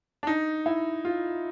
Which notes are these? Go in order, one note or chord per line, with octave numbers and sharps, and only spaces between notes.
D4
D#4
E4
F4